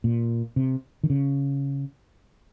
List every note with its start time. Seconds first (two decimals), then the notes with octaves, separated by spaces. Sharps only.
0.04 A#2
0.56 C3
1.03 D#3
1.10 C#3